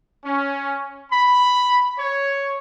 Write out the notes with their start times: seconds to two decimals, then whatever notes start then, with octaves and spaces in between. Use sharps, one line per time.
0.24 C#4
1.12 B5
1.98 C#5